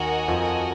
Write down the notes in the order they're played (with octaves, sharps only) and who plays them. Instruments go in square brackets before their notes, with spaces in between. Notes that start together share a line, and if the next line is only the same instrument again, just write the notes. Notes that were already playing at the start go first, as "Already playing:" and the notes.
Already playing: [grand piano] D#2 [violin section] F#4 A#4 D#5 G#5
[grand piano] F2 F3